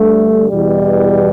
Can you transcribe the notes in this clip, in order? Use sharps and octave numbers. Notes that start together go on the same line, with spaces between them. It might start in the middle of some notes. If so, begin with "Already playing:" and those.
Already playing: G2 D3 A3
E2 B2 G3